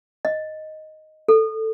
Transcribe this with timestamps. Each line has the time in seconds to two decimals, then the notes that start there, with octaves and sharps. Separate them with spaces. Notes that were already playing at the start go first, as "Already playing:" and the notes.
0.25 D#5
1.28 A4